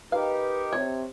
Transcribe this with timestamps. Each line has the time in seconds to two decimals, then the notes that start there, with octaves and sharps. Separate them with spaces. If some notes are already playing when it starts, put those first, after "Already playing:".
0.12 D#4 G4 A#4 B4 F5
0.73 C3 C#5